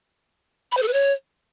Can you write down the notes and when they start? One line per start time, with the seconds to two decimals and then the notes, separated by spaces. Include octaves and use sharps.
0.72 B5
0.77 C5
0.82 A4
0.88 B4
0.93 C#5